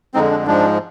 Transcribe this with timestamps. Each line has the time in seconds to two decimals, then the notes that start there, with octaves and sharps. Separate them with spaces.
0.14 F2 D3 G#3 C4 D#4
0.31 D4
0.46 G#2 F3 G#3 D4